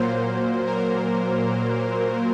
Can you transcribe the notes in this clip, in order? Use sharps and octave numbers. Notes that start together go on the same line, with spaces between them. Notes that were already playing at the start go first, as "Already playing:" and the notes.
Already playing: A#2 F#3 A#3 C5
A#4